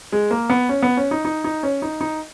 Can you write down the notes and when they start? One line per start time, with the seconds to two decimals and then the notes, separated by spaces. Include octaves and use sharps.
0.12 G#3
0.31 A#3
0.50 B3
0.69 C#4
0.83 B3
0.97 C#4
1.11 D#4
1.25 D#4
1.44 D#4
1.63 C#4
1.82 D#4
2.01 D#4